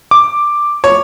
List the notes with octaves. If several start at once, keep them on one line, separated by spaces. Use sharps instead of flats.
D6
C#5